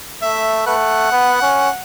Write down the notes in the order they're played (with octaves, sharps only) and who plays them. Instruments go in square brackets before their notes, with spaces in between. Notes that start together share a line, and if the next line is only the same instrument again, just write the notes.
[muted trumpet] A3 [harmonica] E5
[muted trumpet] A3 [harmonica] B4 F#5
[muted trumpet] B3
C#4